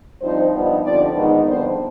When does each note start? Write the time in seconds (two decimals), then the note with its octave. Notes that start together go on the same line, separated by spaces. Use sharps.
0.21 G2 F3 C4 D#4 C5
0.53 G2 F3 B3 D#4
0.84 G2 D3 F3 C4 D#4 D5
1.15 G#2 D#3 B3 D#4
1.46 F2 D3 G3 B3 C5